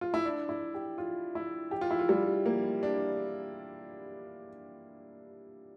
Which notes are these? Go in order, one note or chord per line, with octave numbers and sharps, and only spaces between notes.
F4
E4
D4
E4
G4
F4
E4
G4
F4
E4
F4
G3
A#3
D4